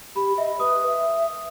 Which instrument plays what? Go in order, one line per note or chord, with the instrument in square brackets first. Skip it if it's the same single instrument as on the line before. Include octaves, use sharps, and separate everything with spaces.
[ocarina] G4 [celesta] B5
[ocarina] D#5 [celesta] E5
[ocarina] B4 [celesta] D#6
[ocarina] E5